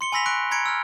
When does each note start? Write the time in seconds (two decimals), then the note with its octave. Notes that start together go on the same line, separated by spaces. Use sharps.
0.01 C6 C#7 G7
0.12 G#5 B5 E6 A#6 B6 F7
0.26 C#6 F#6 D7
0.51 A#5 B5 G#6 C#7 D7
0.66 E6 F6